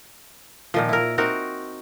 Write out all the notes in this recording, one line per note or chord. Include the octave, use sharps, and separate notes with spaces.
A#2 D#3 F3
E4 A#4
C4 D#4 F#4 A#4